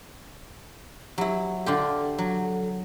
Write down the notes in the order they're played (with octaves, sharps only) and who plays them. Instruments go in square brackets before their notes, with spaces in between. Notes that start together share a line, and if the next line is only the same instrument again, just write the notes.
[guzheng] F#3 E4 [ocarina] G4
[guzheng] D3 F4 G4 [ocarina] A4
[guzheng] F#3